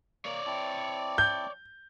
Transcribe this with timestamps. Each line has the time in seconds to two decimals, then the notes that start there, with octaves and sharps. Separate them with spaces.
0.25 A#3 C#5 D5
0.46 C4 E4 A5
1.18 G6